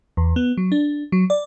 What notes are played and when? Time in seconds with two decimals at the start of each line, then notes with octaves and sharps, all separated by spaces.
0.17 E2
0.36 B3
0.57 F#3
0.72 D4
1.12 F#3
1.30 D5